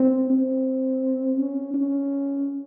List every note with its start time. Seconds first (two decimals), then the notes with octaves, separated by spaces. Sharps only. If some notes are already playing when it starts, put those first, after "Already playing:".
Already playing: C4
0.30 C4
1.38 C#4
1.74 C#4